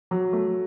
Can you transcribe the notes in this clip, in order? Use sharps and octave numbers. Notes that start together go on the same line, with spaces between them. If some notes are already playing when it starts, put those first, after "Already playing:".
F#3
A3